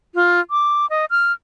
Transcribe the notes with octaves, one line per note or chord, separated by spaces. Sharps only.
F4
D6
D#5
F6